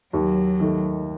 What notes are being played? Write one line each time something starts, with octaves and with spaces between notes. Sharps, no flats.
D#2 F#3
D#3 A3